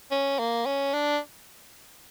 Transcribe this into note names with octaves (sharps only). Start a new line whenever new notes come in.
C#4
A#3
C#4
D4